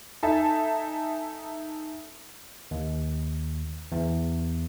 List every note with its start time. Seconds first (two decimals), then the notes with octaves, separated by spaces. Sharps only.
0.23 D#4 A4 E5 G#5 A5
2.71 D#2
3.92 E2